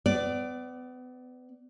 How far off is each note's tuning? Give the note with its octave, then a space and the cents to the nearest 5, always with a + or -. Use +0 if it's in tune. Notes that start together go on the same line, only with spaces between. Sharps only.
B3 +35 D5 +0